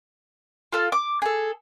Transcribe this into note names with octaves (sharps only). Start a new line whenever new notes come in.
F4 A4 F5
D6
G#4 A4